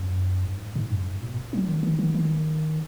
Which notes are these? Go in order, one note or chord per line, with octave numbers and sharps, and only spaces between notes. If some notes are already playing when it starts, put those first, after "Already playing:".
Already playing: F#2
G#2
G#2
F#2
G#2
B2
F#3
D#3
D#3
D#3
D#3